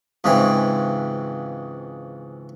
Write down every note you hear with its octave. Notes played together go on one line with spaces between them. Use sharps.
C#2 G#2 C#3 E3 C4